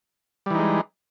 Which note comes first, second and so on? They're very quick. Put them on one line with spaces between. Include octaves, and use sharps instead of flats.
G3 E3 D#4 G#3